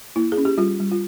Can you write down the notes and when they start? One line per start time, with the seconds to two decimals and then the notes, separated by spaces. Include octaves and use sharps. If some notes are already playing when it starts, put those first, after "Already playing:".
0.16 A#3 E4
0.32 G#4
0.37 C#4
0.45 G4
0.58 G3 F4
0.80 G3
0.91 F4